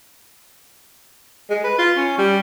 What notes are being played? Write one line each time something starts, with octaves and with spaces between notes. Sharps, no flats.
G#3
B4
F4
C#4
G3